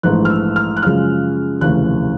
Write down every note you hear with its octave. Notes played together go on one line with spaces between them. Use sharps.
A#1 G#2 E3 A3 F#6
F6
E6
F6
F#6
F#2 C#3 F3 G#3 F6
F1 D#2 C#3 E3 A3 F#6